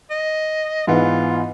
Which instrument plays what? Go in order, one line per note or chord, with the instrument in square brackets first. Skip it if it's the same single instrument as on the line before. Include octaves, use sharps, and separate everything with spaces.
[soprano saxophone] D#5
[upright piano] G#2 E3 B3 [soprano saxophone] F4